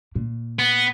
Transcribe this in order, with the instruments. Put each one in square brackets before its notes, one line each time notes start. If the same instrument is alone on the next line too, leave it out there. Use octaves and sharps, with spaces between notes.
[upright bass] A#2
[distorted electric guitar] B3